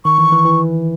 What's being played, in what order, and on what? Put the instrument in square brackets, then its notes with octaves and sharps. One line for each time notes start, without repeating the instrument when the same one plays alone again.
[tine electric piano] D#3 [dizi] C#6
[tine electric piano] E3
E3
E3